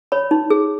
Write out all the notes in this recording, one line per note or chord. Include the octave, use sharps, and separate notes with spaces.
C#5 B5
D#4
G#4